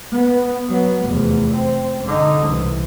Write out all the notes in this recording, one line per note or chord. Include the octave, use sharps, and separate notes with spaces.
B3
F#3 B3
F1 E2
C4
D3 D#4
C2 E3